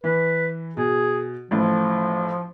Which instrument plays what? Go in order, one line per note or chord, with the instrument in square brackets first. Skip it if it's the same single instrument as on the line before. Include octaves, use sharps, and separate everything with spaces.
[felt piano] E3 [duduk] B4
[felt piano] B2 [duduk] G#4
[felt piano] A1 A2 [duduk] F3